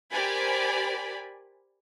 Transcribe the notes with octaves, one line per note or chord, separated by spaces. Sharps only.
G4 A#4 C5 D5 G#5 B5